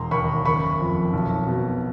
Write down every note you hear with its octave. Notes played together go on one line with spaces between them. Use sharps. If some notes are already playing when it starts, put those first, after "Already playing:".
Already playing: E1 A#5 C6
D#2 B5 C#6
F#1 B5 C#6
F2
B1
B2